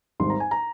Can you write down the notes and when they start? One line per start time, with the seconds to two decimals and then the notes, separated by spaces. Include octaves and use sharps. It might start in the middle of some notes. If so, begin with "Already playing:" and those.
0.20 G#1 G#2 G3 C6
0.30 A#5
0.40 G#5
0.51 A#5